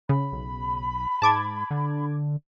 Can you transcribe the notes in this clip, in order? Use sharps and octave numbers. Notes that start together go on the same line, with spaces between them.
C#3 B5
B1
G#2 A5 D6 G#6
D3